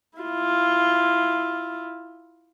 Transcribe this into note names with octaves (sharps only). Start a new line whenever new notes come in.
E4 F4